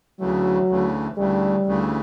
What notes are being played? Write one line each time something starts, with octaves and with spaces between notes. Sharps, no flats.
D2 C#3 E3 F#3 A3
D2 C#3 E3 A3
D2 C#3 E3 G3 A3
D2 C#3 E3 A3